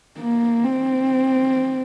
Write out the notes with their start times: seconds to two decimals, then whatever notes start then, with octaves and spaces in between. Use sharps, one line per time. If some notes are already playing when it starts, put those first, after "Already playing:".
0.19 A#3
0.64 C4